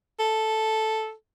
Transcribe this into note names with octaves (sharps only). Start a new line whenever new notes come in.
A4